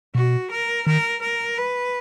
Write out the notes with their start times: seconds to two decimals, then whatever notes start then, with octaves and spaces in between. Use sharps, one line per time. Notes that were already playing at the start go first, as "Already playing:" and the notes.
0.15 B2 F#4
0.51 A#4
0.87 D#3 A#4
1.22 A#4
1.58 B4